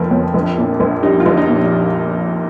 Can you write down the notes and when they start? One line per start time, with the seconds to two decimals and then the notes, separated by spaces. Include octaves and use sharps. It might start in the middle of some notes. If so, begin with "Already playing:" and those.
Already playing: F1 F2 F3 A#3
0.11 F2
0.34 A#1
0.57 A#2
0.80 A#1
1.03 G3 D#4
1.20 F4
1.26 A#1
1.37 D#4
1.49 A#2